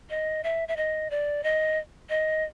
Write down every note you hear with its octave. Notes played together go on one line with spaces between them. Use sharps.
D#5
E5
E5
D#5
D5
D#5
D#5